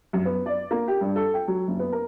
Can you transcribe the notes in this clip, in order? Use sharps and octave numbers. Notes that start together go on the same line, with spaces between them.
F#2
B3
D5
A#3
G4
G2
A4
G5
F#3
F#1
B3
A#4